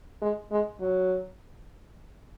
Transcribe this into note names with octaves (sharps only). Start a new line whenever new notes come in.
G#3
G#3
F#3